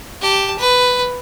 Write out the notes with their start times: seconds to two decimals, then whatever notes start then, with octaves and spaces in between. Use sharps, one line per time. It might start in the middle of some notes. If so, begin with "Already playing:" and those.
0.21 G4 A5
0.59 B4